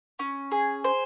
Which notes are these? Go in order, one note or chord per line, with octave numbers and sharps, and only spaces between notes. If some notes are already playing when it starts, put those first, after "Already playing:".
C#4
G#4
C5